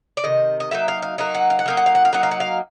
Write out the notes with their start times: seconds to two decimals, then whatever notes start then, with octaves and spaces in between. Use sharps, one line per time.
0.17 D5
0.24 C3 D#3 D#5
0.60 D#5
0.71 F#3 A#3 D#4 E5
0.88 F5
1.02 F5
1.18 F#3 A#3 D#4 F5
1.34 F#5
1.50 F5
1.59 F#5
1.66 F#3 A#3 D#4 F5
1.77 F#5
1.86 F5
1.95 F#5
2.05 F5
2.13 F#3 A#3 D#4 F#5
2.23 F5
2.31 F#5
2.40 F5